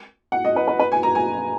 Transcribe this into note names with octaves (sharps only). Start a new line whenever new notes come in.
F#5
D#5
B4
B4
B4
G#5
A#5
G#5